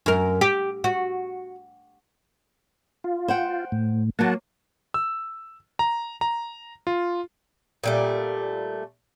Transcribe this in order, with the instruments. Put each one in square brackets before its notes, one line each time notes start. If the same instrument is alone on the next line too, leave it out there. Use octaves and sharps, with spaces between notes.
[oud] F#2 A#4
G4
F#4
[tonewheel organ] F4
[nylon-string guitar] C5 F#5 G5
[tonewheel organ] A2
[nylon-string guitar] F#3 A#3 [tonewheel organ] F#5 A5
[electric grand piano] E6
A#5
A#5
F4
[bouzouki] A#2 G3 A3